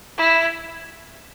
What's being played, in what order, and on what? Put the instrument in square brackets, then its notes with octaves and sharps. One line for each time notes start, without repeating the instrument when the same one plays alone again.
[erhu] E4